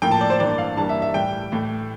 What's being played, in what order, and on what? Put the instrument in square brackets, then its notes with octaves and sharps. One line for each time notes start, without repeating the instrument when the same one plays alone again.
[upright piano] A2 F3 A#3 G5
A5
D5
C5
G2 E3 A#3 D5
F5
G2 E3 G3 A#3 A5
E5
E5
A2 E3 G3 G5
A2 E3 A3